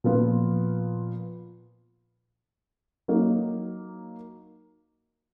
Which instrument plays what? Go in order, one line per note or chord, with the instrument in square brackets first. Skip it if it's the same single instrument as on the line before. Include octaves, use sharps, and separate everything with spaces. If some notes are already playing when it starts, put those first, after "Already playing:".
[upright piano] A#2 F3 B3 F4
F#3 A#3 D#4